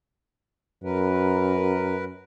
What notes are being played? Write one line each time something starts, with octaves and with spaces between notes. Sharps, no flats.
F#2 A#4 B4